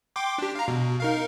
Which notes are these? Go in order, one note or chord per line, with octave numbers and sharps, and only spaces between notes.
G5 C6 D6
D4 G4
F5 A#5
B2
D#4 A#4 F5